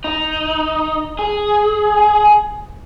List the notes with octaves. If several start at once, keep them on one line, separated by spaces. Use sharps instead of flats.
D#4
G#4